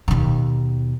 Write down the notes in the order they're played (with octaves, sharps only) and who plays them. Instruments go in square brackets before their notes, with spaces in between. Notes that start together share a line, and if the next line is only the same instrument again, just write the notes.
[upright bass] D#2 B2